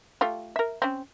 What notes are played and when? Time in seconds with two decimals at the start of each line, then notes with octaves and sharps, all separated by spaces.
0.21 A3 F4 G4
0.56 A#4 E5
0.82 C4 C#4